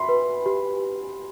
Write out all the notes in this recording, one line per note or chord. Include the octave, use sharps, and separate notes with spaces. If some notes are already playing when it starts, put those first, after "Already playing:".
Already playing: E5 B5 C6
B4
G4